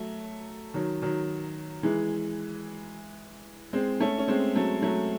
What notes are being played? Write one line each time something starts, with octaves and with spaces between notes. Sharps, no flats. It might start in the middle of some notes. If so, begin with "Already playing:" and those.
Already playing: F#3 A3
D#3 F#3
D#3 F#3
E3 G#3
G#3 C4
A3 C#4
C#4
G#3 C4
F#3 A3
F#3 A3